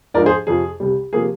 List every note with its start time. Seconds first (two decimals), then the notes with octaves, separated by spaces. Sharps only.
0.14 G#2 F3 G#3 D4 A#4 D5
0.26 G#4 C5
0.47 F2 C3 F3 G#4
0.80 C2 C3 G3
1.13 C3 F3 A#3 G#4